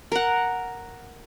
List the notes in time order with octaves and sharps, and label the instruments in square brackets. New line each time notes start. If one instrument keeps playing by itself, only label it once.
[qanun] A#4 F#5